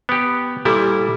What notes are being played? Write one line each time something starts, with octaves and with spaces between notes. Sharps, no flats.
B3 G4
A#2 G3 E4 G4 A4